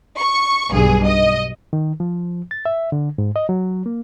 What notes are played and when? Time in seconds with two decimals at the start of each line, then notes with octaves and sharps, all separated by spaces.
0.18 C#6
0.71 B1 G2 G#4
1.05 D#5
1.73 D#3
2.00 F3
2.51 A6
2.66 E5
2.92 D3
3.18 G#2
3.36 D#5
3.49 F#3
3.86 A#3